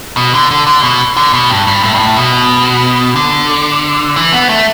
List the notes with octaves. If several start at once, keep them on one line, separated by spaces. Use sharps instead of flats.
B2
D3
D3
D3
B2
D3
B2
G2
G2
A2
G2
A2
B2
D3
E3
B3
A3